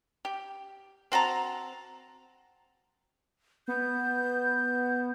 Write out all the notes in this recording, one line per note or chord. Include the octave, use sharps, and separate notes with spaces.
G4
C4 F#4 A5 A#5
B3 G6